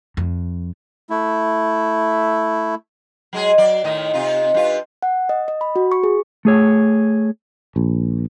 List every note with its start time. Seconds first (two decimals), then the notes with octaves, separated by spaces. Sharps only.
0.17 F2
1.10 A3 E4
3.33 F#3 G#3 G#4
3.58 F#3 D5
3.84 A2 D#3 D#5
4.14 C3 D#4 F4
4.54 G2 F4
5.02 F#5
5.29 D#5
5.48 D#5
5.61 B5
5.76 F#4
5.92 C#6
6.03 G#4
6.45 A3 G#4 C#5
7.76 A#1